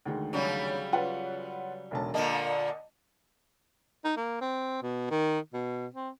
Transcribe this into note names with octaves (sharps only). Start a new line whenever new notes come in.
D2 D#3 G#3
C#3 F#3 G3
F4 B4 F#5
E1 B1 A5
A#2 D3 A#3 D#5 A5
D#4
A#3
C4
B2
D#3
B2
C4